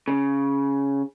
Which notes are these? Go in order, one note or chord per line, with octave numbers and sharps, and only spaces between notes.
C#3